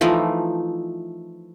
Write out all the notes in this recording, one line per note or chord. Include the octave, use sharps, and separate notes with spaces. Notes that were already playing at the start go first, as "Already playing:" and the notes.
E3 F3 A3 D#4